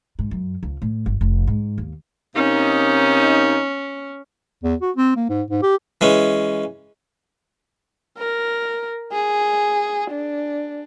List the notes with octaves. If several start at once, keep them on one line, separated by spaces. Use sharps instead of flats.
G#2
F#2
C#2
A2
G1
F1
G#2
D#2
C3 A#3 C#4 D#4
E2
F#4
C4
A#3
G#2
G#2
G4
E3 G#3 C#4
A#4
G#4
D4